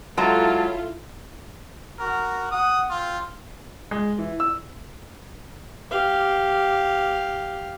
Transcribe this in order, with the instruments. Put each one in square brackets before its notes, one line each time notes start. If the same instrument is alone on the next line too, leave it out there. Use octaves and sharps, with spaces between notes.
[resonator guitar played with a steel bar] F#3 G#3 A#5 [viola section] E4 F4 A4 [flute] A5
[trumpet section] F#4 A#4
F#5 D#6
C4 F4
[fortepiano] G#3
E3
E6
[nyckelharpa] G4 F5